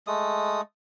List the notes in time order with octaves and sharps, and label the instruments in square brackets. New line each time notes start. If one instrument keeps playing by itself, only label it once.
[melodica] G#3 A3 D#6